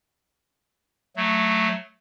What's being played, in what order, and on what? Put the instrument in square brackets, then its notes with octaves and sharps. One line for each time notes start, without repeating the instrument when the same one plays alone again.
[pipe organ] F#3 A3